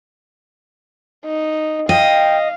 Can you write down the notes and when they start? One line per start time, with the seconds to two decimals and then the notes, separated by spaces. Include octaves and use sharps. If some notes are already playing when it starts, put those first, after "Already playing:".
1.25 D#4
1.89 D#5 F5 G5